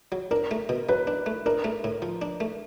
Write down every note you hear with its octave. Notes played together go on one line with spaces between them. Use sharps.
F#3
D4 A#4
A3
B2
F#3 B4
D4
A3
D4 A#4
A3
A2
F3
D4
A3